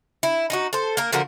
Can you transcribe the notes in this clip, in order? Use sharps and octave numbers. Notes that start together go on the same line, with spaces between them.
E4
D#4 E4 F#4
A4 C5
A#3 A#4
D3 F3 F#4 A#4